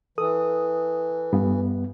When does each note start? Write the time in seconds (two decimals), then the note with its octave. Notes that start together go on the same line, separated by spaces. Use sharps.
0.18 E3 A4 D#6
1.33 G2 B3